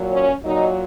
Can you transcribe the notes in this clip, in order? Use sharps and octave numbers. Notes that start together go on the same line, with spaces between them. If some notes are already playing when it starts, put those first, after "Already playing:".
Already playing: A#2 F#3
C#4
A#2 F#3 D#4